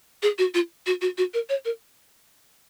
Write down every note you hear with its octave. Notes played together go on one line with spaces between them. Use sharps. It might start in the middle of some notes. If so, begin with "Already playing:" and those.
G#4
F#4
F4
F#4
F#4
F#4
A#4
C#5
A#4